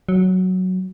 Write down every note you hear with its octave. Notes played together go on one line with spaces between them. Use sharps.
F#3